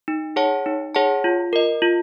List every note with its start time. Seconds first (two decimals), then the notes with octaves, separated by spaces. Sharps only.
0.08 D#4
0.36 G#4 C#5 F#5 A5
0.66 D#4
0.95 G#4 C#5 F#5 A5
1.24 F4
1.53 A#4 D#5
1.82 F4